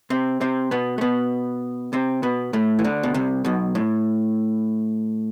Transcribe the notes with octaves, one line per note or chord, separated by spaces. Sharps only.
C3 C4
C3 C4
B2 B3
A3
B2 B3
C3 C4
B2 B3
A2 A3
E3
D2 D3
B2
C2 C3
B1 B2
A2